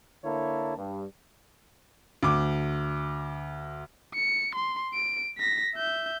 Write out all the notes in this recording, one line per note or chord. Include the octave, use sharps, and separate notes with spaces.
D3 A#3 E4 C#5 A5
G2
D2 D6
C#7
C6
D7
A#6 B6
E5 G6